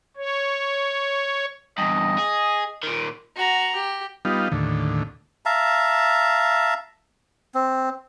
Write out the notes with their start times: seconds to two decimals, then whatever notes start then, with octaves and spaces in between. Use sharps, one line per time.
0.17 C#5
1.78 E2 G2 D#5
2.18 G#4
2.83 A#2 D#3
3.36 F#4 A#5
3.76 G4
4.25 G3 B3 D#4 F4
4.52 D#2 A2 D3
5.46 E5 F5 A5 A#5
7.54 C4